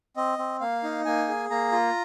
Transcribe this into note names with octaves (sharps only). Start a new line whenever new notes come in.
C4 D#5
C4
A#3 F5
D#4
A#3 G#5
G#4
A#3 A#5
F4